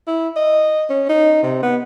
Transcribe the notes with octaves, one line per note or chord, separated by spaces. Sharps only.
E4
D#5
C#4
D#4
C3
B3